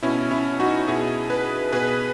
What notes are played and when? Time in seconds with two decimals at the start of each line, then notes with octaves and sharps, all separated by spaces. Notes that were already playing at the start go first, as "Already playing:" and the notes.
0.03 B2 C#4 E4
0.31 C#4 E4
0.59 D#4 F#4
0.88 B2 E4 G#4
1.30 G#4 B4
1.72 B2 G#4 B4